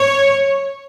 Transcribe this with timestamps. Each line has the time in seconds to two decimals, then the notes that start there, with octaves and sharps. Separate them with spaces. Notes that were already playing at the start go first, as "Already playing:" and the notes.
Already playing: C#5